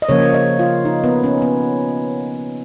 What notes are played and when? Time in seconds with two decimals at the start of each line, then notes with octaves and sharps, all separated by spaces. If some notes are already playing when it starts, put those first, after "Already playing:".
0.02 D#5
0.09 C#3 F3 A#3 C#5
0.34 D#5
0.59 F4
0.85 D#4
1.04 B3
1.24 C#4
1.42 B3